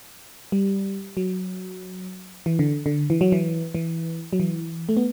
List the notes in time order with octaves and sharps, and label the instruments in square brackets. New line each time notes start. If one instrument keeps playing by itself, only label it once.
[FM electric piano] G3
F#3
E3
D3
D3
E3
F#3
E3
E3
F#3
E3
A3
B3